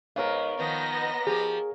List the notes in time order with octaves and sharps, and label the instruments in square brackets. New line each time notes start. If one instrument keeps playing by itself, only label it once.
[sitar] G#2 B3 [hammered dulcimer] A#4 C#5 F5
[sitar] D#3 F3 [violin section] B3 D#5 A#6
[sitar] F3 G4 [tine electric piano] G#4